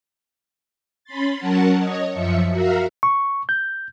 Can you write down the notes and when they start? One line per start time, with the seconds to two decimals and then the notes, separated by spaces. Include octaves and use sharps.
1.04 C#4 B5 C6 A6
1.38 F#3 C#4 A#4 F#5 A5
1.78 C#5 D#5
2.10 F#2 F3 E5 C#7
2.50 F#4 A#4 E5 F5
3.03 C#6
3.49 G6